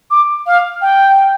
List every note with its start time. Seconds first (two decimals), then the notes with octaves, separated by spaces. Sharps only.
0.11 D6
0.47 F5
0.82 G5